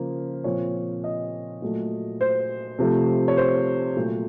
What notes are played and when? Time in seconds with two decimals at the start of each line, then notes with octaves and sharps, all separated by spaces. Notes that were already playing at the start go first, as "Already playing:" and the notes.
Already playing: C#3 F3 A#3
0.44 A#2 F3 C4 C#5
1.04 D#5
1.62 A#2 F#3 A3
2.21 C5
2.79 C3 F3 A3
3.28 C#5
3.37 C5
3.96 A#2 F#3 A3